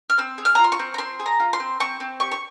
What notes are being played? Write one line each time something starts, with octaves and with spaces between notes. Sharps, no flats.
F6
C4 E6
G#4
F6
A#5
F4
C6
C#6
C4
A#5
C4 C6
G#4
A#5
F4
C6
C4
C4 C#6
C4
G4 C#6
C#6